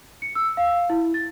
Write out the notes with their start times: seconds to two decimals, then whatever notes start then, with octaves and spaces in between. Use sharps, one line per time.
0.22 C#7
0.35 E6
0.57 F5
0.90 E4
1.14 A6